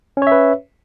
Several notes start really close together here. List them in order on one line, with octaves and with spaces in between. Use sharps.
C#4 C#5 E5 B4